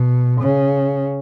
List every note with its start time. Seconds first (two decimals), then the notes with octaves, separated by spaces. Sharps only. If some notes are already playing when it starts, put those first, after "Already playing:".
Already playing: B2
0.41 C#3